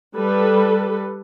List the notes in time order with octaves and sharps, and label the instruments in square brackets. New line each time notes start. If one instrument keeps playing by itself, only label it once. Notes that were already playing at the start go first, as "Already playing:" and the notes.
[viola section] G3 A4 B4